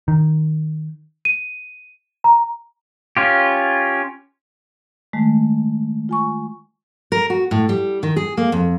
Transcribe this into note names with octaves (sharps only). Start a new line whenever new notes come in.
D#3
D#7
A#5
C#4 F4 G4
D#3 G#3 A3
F4 G#5 C#6
A#4
F#4
A2
G3
D#3
G#4
A#3
F2